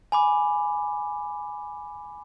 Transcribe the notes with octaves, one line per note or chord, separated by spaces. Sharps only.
G#5 B5 D6